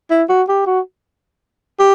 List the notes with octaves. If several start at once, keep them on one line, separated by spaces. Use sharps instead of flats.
E4
F#4
G4
F#4
G4